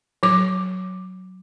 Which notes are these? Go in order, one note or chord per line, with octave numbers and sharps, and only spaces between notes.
F#3 D6